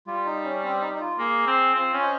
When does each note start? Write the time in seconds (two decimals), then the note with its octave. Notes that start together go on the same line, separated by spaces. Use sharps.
0.07 G3 F4
0.26 D#4
0.44 C#4
0.64 C4
0.82 D#4
0.95 D#4
1.00 F4
1.19 A#3 G#4
1.47 C4
1.75 C4 F4
1.94 C#4
2.02 C5 D#5